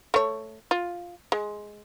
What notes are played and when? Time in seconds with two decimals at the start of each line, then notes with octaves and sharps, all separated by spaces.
0.14 A3 C#5
0.71 F4
1.32 G#3